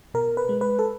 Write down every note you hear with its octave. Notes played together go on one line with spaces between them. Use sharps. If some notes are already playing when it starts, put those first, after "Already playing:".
B2 A#4
B4
G#3
B4
A4